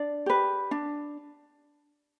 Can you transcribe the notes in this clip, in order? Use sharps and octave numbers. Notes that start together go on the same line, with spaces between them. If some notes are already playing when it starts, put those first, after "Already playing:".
Already playing: D4 D5
G4 B4
D4